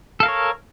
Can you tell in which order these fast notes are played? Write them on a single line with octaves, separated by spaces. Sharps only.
A4 F5 A#4 C#5